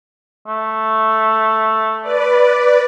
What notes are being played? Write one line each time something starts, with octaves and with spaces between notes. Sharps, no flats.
A3
B4 D5